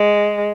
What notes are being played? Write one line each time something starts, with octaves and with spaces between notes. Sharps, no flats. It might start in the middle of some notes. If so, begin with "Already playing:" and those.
Already playing: G#3